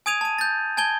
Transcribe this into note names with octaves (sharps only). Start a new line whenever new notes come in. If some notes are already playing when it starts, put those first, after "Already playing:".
G#5 D#6 G#6 D#7 F7
A5 D#7
G6 A6
G#5 A5 G#6 G7